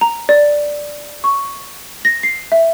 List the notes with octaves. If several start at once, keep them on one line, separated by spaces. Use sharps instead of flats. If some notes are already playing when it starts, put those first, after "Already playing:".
A#5
D5
C#6
A#6
C7
E5